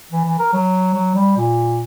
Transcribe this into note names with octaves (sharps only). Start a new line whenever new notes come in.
E3
E3
A#4
F#3
F#3
G3
A#2